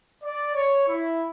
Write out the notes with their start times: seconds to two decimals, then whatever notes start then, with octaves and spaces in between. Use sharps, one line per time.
0.24 D5
0.56 C#5
0.88 E4